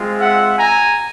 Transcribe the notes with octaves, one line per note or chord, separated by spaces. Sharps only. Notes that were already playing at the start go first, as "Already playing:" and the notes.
Already playing: G#3 C4 F4
E5 F#5
G#5 A#5